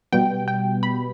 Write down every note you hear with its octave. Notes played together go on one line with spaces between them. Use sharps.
B2 G3 B3 G5
G5
B5